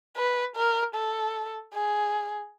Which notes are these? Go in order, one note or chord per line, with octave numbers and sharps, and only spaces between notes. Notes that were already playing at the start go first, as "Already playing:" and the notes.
B4
A#4
A4
G#4